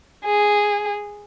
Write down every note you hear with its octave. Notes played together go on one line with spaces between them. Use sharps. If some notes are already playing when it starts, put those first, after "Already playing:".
G#4